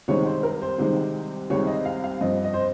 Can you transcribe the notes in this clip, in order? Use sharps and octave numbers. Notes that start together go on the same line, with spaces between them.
C2 C3 D#3 G#3 C4 C#5
C5
A#4
C5
C2 C3 D#3 G#3 C4
C2 C3 D#3 G#3 C4 C#5
D#5
F5
F5
G2 F3 C4 D#5
D#5
C5